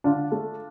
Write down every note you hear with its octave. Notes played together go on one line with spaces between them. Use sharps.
D3 D4 F4
A3